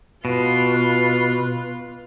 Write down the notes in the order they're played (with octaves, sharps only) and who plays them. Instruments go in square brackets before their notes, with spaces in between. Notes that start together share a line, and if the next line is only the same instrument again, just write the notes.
[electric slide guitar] B2 [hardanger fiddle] F4 [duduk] B4